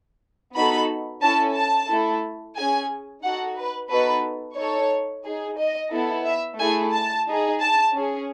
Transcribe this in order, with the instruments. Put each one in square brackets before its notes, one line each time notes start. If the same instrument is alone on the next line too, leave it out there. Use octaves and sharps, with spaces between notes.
[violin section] B3 D#4 F#4 A4 B5
C#4 E4 A4 A5
A5
A3 E4 A4
C#4 G#4 G#5
D#4 F#4 A4 F#5
B4
B3 D#4 F#4 A4 B4
D#4 A4 C#5
D#4 G#4
D#5
B3 E4 A4
E5
A3 E4 G#4 G#5
A5
D#4 G#4
A5
C#4 G#4